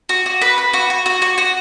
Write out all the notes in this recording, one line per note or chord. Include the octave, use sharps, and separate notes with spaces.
F#4
F#4
B4
B4
F#4
F#4
F#4
F#4
F#4